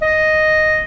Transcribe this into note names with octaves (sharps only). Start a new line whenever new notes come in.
D#5